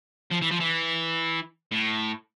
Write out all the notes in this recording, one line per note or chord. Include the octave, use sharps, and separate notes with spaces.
F3
E3
F3
E3
A2